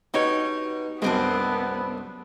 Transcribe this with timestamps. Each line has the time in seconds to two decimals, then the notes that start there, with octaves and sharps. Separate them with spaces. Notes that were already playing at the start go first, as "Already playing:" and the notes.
0.14 B2 D#4 G4 C#5
1.02 C2 F#2 G#3 B3 C4 D4